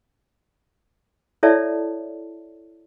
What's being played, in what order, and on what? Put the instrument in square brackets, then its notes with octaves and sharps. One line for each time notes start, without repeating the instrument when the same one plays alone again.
[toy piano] E4 A4 C#5 D5 E5 A5